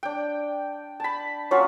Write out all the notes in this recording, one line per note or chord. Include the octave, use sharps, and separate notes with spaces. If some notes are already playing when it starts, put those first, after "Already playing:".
D4 G5
A5 B5
F#3 A#3 C#4 F4